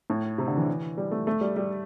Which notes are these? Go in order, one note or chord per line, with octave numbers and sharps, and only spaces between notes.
A2
C3
D3
E3
G3
A3
A3
G3
G3